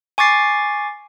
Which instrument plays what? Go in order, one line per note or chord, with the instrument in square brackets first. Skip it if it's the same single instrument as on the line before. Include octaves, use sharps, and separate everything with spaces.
[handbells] G#5 C#6 D6 A6 C7